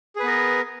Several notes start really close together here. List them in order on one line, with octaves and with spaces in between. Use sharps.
G#4 B4 B3 A#4